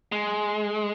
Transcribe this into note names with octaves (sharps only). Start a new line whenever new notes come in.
G#3